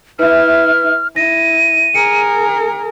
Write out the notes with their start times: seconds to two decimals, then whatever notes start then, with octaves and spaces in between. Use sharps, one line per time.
0.19 E4 B4 E5 F6
1.16 E4 A#6 D#7
1.95 G#4 A#4 C#7